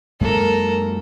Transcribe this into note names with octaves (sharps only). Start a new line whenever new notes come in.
F#2 G#3 A#3 A4 A#4